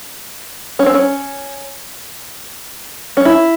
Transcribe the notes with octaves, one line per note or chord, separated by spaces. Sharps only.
C#4
C4
C#4
C#4
E4